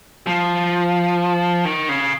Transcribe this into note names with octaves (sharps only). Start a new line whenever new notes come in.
F3
D#3
C#3